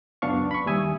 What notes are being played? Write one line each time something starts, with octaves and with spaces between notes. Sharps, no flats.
C#2 F#2 B3 D4 F5 C#6
B5 C#6
D#2 G3 E5 G#5 D#6 E6